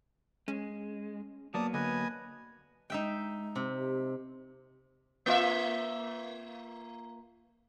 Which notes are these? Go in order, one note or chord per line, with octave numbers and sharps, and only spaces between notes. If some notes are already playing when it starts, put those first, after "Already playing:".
G#3 C#4
F#3 A#3 B3 D5 A5 D#6
D3 B4 D#5 G#5
G#3 D#4 E5 G5
C3
G4
A#3 F4 E5